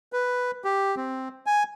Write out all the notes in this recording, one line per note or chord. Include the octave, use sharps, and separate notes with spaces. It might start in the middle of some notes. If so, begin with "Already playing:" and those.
B4
G4
C4
G#5